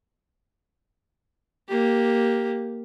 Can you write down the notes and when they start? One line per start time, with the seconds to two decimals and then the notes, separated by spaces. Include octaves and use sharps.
1.68 A#3 G4